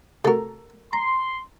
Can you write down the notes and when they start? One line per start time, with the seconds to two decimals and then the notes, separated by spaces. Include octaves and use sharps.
0.24 C3 A3 F#4 A4 A#4
0.93 A#5 C6